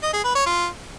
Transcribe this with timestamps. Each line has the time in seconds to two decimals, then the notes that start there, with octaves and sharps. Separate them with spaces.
0.03 D#5
0.14 G#4
0.24 B4
0.35 C#5
0.46 F4